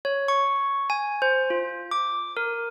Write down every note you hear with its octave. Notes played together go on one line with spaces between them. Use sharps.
C#5
C#6
G#5
C5
F4
D6
A#4